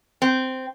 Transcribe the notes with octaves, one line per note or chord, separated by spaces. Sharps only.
C4